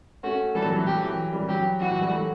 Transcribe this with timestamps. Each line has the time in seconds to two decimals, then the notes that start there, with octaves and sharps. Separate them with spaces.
0.23 A3 C#4 F#4
0.55 E3 G3 A4
0.65 F#3
0.76 E3
0.86 F#3 G4
1.03 E3
1.33 E3 G3
1.48 F#3 G4
1.80 E3 F#4
1.91 F#3
2.01 E3 G3
2.12 F#3 A3